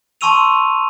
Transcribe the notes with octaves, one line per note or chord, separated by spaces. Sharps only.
A5 C6 C#6 E6 D#7 F7